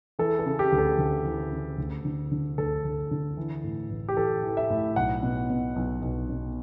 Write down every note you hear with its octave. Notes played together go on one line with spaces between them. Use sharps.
E3 A4
A4
C#3
G4
D2
A4
D2
E3
C#3
D2
D3
D3
D2 A4
D2
D3
E3
A2
A1
G4
A1 A4
E3
E5
A2
B1 F#5
B2
B2
B1
B1
B2